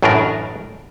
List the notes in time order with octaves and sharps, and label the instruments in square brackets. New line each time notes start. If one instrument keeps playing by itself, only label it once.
[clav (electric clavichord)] A1 F#2 A2 C#3 D4 A#4